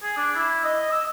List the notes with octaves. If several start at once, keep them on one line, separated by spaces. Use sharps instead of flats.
G#4
D4
E4
D#5
E6